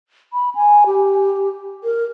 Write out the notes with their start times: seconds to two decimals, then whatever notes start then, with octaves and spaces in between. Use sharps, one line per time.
0.33 B5
0.55 G#5
0.87 G4
1.84 A#4